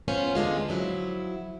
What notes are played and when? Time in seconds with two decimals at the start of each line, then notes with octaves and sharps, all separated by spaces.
0.08 B3 C#4 F4 C5
0.35 E2 D3 G#3 F4
0.69 F3 F#3 E4